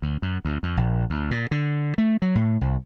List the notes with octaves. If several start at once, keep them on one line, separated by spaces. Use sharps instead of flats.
D2
F#2
D2
F2
A#1
D2
A#2
D3
A3
F#3
A2
C2